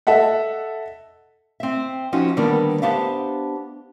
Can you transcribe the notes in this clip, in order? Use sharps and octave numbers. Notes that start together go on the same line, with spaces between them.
A4 D#5 E5 F#5
C4 E5
F3 C#4 D#4 F#4
D3 D#3 G3 A#3 B3 D4
B3 D4 G4 C5 E5 F5